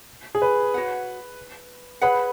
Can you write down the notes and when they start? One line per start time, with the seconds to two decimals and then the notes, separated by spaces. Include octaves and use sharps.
0.35 G#4
0.42 B4
0.74 F#4 C#5 F#5
2.01 G#4 B4 C#5 F#5 B5